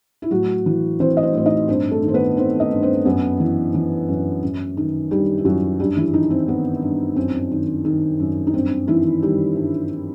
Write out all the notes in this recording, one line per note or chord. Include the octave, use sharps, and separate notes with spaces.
E4
A2 F#3 F#4
E3
E3 C4 C5
D#5
C4 C5
A2 C5
D#4 D#5
G2 C4 C5
A3 A4
D#3
C5
B3 B4
D#3 C4 C5
D#4 D#5
G2
C4 C5
F#2 B3 B4
E3
E3
F#2
F#2
D#3
D#3 G3 G4
E4
F#2 F#3 F#4
G2 G3 G4
E3 E4
D#3 D#4
C4
D#3 B3
G2
F#2 C4
D#3
D#3
F#2
D#4
G2 C4
D#3 E3 E4
D#3 G3 G4
G2